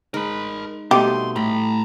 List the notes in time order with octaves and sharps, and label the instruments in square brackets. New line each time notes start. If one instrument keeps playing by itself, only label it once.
[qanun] G#3 D#4 [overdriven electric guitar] A#4 B5
[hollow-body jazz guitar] B2 D#4 [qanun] G3 A3 C4 [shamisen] G4 [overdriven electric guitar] C6
[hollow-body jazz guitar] A2 [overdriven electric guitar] A#5 B5